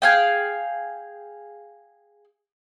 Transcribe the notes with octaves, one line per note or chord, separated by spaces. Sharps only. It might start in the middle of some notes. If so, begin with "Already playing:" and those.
G#4 F5 G5